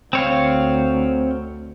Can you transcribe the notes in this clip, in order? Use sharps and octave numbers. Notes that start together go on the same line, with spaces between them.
D2 C4 C#5 F5